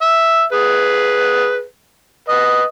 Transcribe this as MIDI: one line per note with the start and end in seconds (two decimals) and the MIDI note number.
0.02 0.43 76
0.52 1.63 68
0.52 1.63 71
2.29 2.64 71
2.29 2.64 75